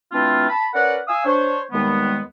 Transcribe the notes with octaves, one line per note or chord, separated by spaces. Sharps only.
E3 A3 C4 D4 E4 F4
A5 B5
C#4 A#4 B4 D5 F#5
F5 G#5 D#6 E6
D4 C5 C#5
D#2 D#3 G3 G#3 B3